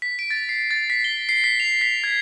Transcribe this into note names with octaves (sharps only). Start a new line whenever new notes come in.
B6
D7
A6
C7
A6
B6
G7
C7
B6
F7
B6
G#6